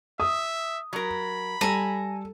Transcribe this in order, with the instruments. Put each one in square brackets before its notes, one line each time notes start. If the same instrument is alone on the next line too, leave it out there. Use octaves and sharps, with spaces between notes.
[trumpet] E5 [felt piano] D#6
[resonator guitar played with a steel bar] F#3 A#4 [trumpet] B5
[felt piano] G3 [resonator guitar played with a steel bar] A4 [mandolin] G#5 A#5